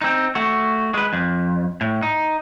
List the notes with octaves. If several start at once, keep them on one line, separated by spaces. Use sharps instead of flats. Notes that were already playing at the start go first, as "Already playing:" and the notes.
C4 D#4
A3 F#4
G#3 B4
F2
A2
D#4